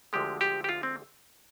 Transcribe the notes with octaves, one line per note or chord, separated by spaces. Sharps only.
D2 D3 F3 G#3 G4
G4
G4
F4
C4